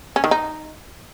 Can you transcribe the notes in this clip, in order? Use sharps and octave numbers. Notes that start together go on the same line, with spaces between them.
C#4
D#3
D#4